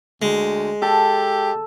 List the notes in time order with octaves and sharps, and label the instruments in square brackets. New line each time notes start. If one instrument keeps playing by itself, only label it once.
[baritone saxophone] D2 [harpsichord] G#3
[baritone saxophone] G4 [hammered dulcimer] A4